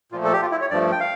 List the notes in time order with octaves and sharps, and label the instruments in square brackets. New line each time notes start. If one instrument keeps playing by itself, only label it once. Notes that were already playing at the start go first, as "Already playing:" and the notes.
[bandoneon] A#2 F3 A3 F4
A4
G4
F4
E4
C#5
G2 F3 A3 D5
G5
F5